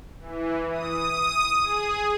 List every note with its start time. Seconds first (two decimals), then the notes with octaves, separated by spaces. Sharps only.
0.20 E3
0.71 D#6
1.62 G#4